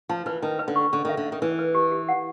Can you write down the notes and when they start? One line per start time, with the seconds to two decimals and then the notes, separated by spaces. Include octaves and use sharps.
0.09 F3 A5
0.26 E3 B4
0.42 D#3 A5
0.59 B4
0.68 D3
0.76 C#6
0.92 D3 C#6
1.05 D#3 E5
1.17 D3
1.25 E5
1.32 D#3
1.42 E3 B4
1.59 B4
1.75 G4
1.92 G4
2.08 F#5